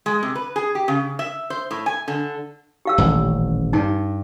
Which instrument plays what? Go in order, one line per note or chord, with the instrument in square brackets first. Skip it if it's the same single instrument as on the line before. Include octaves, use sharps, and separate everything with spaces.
[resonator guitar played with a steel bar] G#3
C3
B4
G#4
G4
C#3
E5
C5
A2
G#5
D3
[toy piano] G4 F5 E6
[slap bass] D#1 A1
[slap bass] G2 [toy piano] D#4